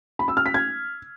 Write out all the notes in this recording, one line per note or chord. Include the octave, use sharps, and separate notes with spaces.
B5
E6
F6
B6
G#6